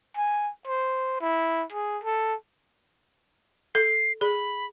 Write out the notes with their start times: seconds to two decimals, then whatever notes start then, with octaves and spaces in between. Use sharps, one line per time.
0.16 G#5
0.67 C5
1.21 E4
1.72 G#4
2.04 A4
3.75 A4 C7
4.21 G#4 B5